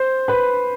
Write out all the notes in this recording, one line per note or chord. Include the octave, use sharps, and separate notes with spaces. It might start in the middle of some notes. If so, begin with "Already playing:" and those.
Already playing: C5
B4